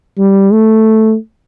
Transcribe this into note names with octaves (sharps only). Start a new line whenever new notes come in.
G3
A3